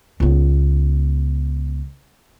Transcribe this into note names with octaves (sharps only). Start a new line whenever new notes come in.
C#2 B3